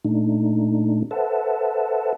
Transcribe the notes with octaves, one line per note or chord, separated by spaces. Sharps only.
A#2 A3 D4 D#4
A4 B4 C5 E5 F#5 A5